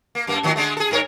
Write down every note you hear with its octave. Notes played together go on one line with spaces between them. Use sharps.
A#3
F#2 A#3
A2 D#3 F#3
D3 G#3 A3
G#4 A4
G2 A#4 C#5